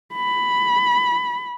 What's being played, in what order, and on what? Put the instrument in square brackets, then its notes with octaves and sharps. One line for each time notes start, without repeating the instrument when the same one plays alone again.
[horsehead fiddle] B5